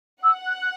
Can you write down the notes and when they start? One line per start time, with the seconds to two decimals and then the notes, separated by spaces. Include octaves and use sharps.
0.23 F#5 E6
0.46 F#6
0.61 F#6